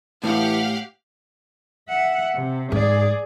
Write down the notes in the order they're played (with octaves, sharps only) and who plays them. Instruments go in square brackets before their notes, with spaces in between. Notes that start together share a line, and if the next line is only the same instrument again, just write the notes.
[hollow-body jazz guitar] A2 [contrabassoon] E3 [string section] G4 F5 F#5
[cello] E5 F#5
C3
[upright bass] G#2 [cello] G#4 D5